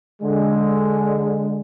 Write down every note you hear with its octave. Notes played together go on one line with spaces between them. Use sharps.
D3 G#3